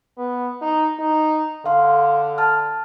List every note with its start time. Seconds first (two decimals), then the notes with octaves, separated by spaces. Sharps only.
0.18 B3
0.62 D#4
0.99 D#4
1.66 D3 F5 C6
2.38 A5 F6